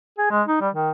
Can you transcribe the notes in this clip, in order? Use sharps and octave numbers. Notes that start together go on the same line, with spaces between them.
G#4
G#3
D#4
G3
D#3